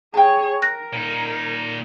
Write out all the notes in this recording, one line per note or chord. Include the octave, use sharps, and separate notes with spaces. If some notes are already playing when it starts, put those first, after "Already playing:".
G#4 C#5 G5 A5
A#4 F#6 A#6
A#2 D#4